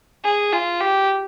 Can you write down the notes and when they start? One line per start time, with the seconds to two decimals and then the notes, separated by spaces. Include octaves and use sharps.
0.24 G#4
0.52 F4
0.80 G4